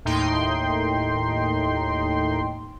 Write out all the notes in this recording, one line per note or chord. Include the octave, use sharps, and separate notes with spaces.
D#2 A2 D#4 G5 C6